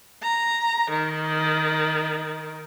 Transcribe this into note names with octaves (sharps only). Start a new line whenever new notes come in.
A#5
D#3